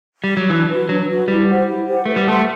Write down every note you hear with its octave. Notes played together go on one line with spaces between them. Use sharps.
G3
F#3
E3 D4
F#4 B4
F#3 D4
F#4 B4
G3 E4
G4 C5 F#5
E4
G4 C5 F#5
A3 B4
G3
A3 F#5 A5 C6